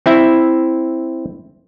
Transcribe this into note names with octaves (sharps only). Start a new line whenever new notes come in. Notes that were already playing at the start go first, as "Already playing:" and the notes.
C4 E4 E5